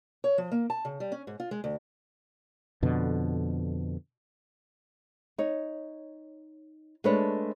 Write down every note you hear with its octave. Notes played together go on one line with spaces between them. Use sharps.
C#5
F3
A#3
A5
C#3
G3
C#4
G#2
F4
G#3
D2
F2 B2 D3
D#4 C#5
G#3 A3 D4 B4 C#5